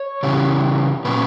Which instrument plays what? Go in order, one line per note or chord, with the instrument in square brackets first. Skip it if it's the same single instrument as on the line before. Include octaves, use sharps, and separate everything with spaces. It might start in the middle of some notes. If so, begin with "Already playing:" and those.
Already playing: [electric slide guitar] C#5
C#3 E3 G3 C#4
A#2 F#3 C#4 B4